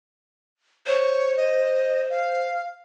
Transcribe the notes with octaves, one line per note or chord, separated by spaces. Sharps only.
C5 C#5
D#5
F5